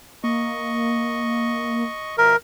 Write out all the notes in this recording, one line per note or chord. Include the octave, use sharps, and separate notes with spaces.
A#3 D#5 C#6
B2 F3 A#4 E5